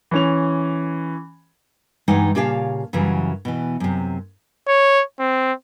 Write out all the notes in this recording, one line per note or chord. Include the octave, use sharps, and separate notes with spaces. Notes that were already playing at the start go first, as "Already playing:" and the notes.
E3 C#4 F7
G2 E3 G#3 D#4 F#5
A#2 C#3 G4 C#5 F5 A5
F#2 C#3 E3 F#3 G3
B2 E3
F#2 C3
C#5
C4